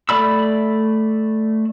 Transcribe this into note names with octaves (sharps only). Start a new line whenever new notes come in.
A3 D5 B5 E6